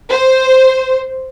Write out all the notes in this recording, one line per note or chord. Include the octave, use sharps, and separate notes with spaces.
C5